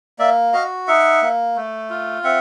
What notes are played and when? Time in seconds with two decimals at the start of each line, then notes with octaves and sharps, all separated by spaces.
0.19 A#3 D5 E5
0.53 F#4 D#5 F5
0.88 D#4 E5 F#5
1.22 A#3
1.56 A3
1.90 F4
2.24 C4 E5 F#5